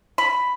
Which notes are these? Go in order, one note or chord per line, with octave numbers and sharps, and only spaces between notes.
B5